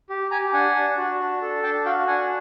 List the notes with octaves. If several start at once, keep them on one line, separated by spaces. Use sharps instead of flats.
G4
G4 G#5 A#5
D4 F#5 G#5
D4
F#4
D4
A4
D4 G5 A5
F#4 F5 G5
D4 F#5 G#5